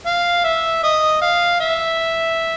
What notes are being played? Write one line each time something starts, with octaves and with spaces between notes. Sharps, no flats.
F5
E5
D#5
F5
E5